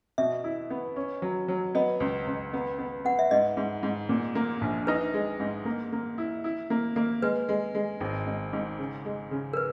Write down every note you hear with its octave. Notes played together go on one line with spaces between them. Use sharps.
B2 E5
E4
B3
C#4
F#3
F#3
B3 D#5
C#2
C#2
B3
B3
B3 F#5
E5
G#2 D#5
G#2
G#2
A#2
A#3
A#1
D#4 B4
G#3
G#2
A#3
A#3
E4
E4
A#3
A#3
G#3 B4
G#3
G#3
G#1
G#2
G#2
C#3
G#3
C#3
A#4
B4